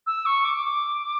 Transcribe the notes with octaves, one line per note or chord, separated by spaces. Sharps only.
E6
C#6
D6
D6